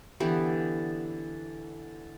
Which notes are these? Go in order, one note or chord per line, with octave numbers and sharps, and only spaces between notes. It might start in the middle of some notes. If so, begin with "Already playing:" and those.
D3 E3 B3 G4